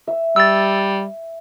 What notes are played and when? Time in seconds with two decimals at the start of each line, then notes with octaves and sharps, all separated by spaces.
0.07 E5
0.36 G3 E6 A6